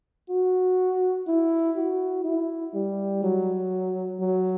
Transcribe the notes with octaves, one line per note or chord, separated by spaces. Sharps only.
F#4
E4
F#4
E4
G3
F#3
F#3